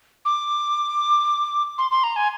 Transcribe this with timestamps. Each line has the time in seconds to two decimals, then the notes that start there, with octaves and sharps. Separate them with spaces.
0.25 D6
1.78 C6
1.91 C6
2.04 A#5
2.16 G#5